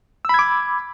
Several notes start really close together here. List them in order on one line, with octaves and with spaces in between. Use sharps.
E6 B5 G#6 D6